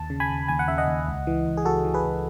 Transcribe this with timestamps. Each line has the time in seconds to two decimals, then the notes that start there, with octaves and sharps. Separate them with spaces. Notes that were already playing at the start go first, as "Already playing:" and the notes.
Already playing: D#2 A5
0.10 C#3
0.20 G#5 B5
0.30 D#2
0.48 D#2 G#5
0.59 F#5
0.68 C#3 E5
0.78 D#5 F#5
0.87 D#2
1.07 C#2
1.27 E3
1.46 C#2
1.57 G#4
1.65 C#2 F#4 A4
1.85 E3
1.94 G#4 B4
2.05 C#2